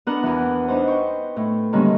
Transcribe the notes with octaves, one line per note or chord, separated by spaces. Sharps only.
B3 D4 A#4 F#5
E2 E3
D4 D#4 B4 C5
G5 C#6
A2
D3 D#3 G3 G#3 A#3 C#4